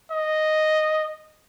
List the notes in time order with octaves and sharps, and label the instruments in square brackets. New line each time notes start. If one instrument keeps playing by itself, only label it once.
[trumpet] D#5